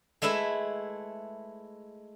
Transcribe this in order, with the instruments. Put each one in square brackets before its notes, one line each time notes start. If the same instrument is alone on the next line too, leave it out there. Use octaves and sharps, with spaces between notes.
[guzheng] G#3 A3 E4 B4 E5